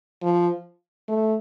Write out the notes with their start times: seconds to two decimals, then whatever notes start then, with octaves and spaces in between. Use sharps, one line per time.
0.22 F3
1.08 A3